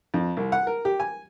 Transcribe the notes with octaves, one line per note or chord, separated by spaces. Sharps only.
F2
C2
F#5
A#4
G4
G#5